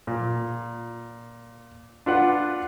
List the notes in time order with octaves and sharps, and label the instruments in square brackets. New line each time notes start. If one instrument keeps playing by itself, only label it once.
[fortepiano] A#2
D4 F4 B4 F#5